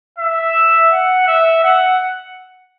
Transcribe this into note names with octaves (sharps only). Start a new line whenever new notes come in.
E5
F#5
E5
F#5